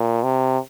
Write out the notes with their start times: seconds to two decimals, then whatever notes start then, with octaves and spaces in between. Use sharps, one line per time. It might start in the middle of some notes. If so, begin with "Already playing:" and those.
Already playing: A#2
0.24 C3